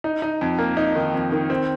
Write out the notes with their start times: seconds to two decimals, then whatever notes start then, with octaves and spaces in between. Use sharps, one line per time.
0.04 D#4
0.22 D#4
0.41 F2
0.58 A#3
0.77 D#4
0.95 D#3
1.14 F2
1.32 D#3
1.50 C4